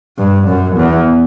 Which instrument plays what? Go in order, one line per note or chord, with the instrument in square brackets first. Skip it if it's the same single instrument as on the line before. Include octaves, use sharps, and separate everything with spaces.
[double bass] G2
F#2
E2